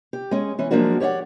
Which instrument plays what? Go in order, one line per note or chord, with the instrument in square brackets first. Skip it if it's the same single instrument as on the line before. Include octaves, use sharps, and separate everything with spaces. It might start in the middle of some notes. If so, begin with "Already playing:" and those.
[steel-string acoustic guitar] G4
G#3 C#4
E3 C#4
F3 F#3 G#3 A#3 D4 F#4
G4 C#5 D5 E5 F#5